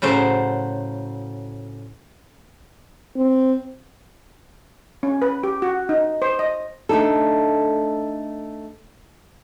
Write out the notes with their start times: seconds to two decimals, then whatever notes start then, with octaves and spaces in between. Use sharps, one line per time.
0.02 A2 C#3 F#3 C5
3.16 C4
5.03 C#4
5.22 B4
5.43 G4
5.62 F#4
5.89 D#4
6.22 C5
6.39 D#5
6.89 A3 D4 D#4 A4